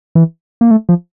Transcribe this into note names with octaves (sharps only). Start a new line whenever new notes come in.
E3
A#3
A3
F3